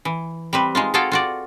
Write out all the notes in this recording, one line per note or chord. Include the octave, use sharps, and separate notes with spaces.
E3
G3 C4 B4
G#3 D#4 F4
F4 F#4 G#4 A4 F5 G5
F4 F#4 D5